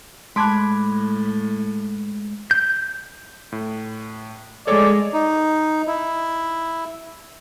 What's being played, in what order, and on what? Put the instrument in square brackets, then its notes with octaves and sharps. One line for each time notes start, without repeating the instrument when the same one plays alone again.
[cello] A2 [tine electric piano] G#3 F#6 [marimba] A5 C6 [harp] B5 D6 G#6
[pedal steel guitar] G6
[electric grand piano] A2
[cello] G#3 [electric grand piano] G#4 A4 C#5 [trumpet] D5
[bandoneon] D#4
E4